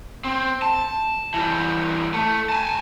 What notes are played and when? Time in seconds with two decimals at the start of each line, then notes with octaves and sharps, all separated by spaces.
0.24 C4
0.62 A5
1.34 E3 G3
2.14 A3
2.49 G#5 A5